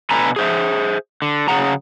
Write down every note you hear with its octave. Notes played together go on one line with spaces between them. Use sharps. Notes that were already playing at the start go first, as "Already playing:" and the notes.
B2 D3 A4 B4 G#5 A#5
G#4 C5 E5
D3
C#3 F#3 G#3 G#4 F#5 A#5